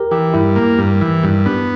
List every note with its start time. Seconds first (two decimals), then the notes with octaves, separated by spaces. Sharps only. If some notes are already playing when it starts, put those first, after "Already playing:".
Already playing: G4 A#4
0.11 E3 G4
0.34 G2 E4
0.56 A#3
0.78 G2
1.01 E3
1.23 G2
1.46 B3 D4